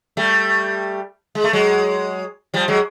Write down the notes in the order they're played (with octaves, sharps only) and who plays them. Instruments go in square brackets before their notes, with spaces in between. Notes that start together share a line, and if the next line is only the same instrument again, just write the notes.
[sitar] G3 A3
G#3
A3
F#3 G#3
F3 G3
F#3 G#3